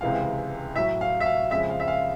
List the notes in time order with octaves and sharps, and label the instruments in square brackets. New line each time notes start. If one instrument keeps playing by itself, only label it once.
[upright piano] C#2 C3 E3 G#3 F5
A2 E5
F#3
F5
E5
F5
F2 C#3 F3 G#3 E5
F5
E5
F5